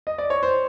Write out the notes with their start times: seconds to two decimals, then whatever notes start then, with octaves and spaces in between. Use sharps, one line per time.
0.07 D#5
0.18 D5
0.30 C#5
0.43 C5